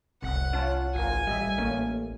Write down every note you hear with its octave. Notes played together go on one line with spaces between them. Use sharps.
F1 C2 F#5
C#4 F4 C#5 A5
G#1 F4 A#4 G#5
A1 G3 D#5 E5
A1 A3 A#3 C#4